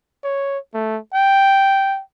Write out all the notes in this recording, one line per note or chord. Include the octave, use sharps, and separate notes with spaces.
C#5
A3
G5